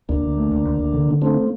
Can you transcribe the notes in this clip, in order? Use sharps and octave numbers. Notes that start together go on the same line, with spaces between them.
D2 A#3 D4
D2
A3
D2
D2
D2
D3
D3
A3 C4 D4
A#3